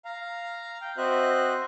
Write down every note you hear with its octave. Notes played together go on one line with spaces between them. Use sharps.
F5 A#5
G5
C4 F#4 C5 D#5 E5 F#6